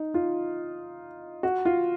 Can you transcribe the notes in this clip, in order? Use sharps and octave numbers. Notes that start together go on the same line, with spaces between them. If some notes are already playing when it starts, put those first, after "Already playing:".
Already playing: D#4
F4
F#4
F4